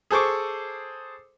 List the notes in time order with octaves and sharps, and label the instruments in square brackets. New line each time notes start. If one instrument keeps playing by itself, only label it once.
[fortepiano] G#4 A4 C5 C#6 D6